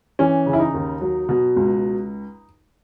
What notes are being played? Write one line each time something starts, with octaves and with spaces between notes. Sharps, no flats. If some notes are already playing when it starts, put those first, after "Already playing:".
E3 C#4
C#3
E4
D#4
D#2
F#3
B2
C#2